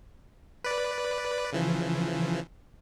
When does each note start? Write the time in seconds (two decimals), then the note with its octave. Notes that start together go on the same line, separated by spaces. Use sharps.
0.64 B4 D5
1.53 C#3 E3 F3